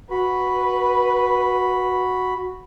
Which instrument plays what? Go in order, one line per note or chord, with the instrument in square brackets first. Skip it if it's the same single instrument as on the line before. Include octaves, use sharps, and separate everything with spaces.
[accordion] F#4 B5 [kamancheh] B4